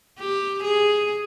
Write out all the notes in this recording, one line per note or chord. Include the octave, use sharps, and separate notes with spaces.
G4
G#4